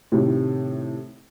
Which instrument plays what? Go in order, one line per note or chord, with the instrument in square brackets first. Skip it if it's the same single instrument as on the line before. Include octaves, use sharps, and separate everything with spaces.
[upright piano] A2 C3 D#3